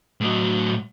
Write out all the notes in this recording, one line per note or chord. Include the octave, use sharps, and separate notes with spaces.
A2 F#3